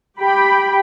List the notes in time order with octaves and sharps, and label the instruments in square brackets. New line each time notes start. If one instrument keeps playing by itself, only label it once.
[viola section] G4 G5 B5